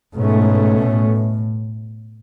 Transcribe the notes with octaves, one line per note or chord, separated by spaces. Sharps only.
G#2 B2 A3 C#4
A2